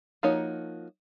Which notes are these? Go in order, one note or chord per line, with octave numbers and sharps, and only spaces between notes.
F3 A#3 D#4 F#4 C#5